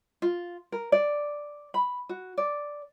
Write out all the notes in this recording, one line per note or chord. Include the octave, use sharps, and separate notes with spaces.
F4
A#4
D5
B5
F#4
D5